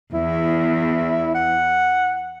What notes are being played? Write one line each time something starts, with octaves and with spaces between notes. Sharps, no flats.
E2 E4
F#5